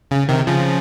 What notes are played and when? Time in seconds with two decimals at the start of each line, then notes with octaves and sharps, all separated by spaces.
0.11 C#3
0.29 C3 D#3
0.47 C#3 F3